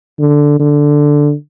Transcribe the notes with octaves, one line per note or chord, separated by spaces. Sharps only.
D3
D3